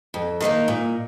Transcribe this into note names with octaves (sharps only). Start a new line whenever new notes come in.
F2
D#3 G3 A#3 D#4
A#2